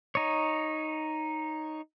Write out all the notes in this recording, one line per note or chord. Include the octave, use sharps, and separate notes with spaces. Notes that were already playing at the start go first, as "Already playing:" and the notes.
D#4 C#5